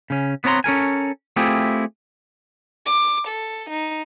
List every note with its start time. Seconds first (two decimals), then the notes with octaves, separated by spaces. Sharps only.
0.10 C#3 C#4
0.44 B3 C4 C#5 A5 A#5 C6
0.64 C#4 A4 A#4 G#5
1.36 A3 C4 E4 F4 G4 G#4
2.86 D6
3.28 A4
3.70 D#4